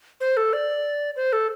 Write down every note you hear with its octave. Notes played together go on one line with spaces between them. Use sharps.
C5
A4
D5
C5
A4